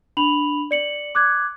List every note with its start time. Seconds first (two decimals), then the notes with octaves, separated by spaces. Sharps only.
0.17 D4 B5 F7 F#7
0.71 D5 C#7 F#7
1.15 D6 F#6 G#6